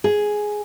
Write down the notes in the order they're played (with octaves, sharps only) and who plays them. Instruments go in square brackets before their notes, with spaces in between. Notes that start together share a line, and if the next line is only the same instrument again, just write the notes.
[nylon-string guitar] G#4